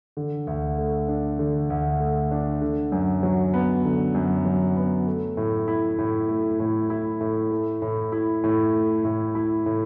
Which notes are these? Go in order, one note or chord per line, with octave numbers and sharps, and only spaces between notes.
D3
D2
A3
D4
D3
D2
A3
D4
D3
F#2
F#3
B3
D3
F#2
F#3
B3
A3
A2
E4
A2
A3
A2
E4
A2
A3
A2
E4
A2
A3
A2
E4
A2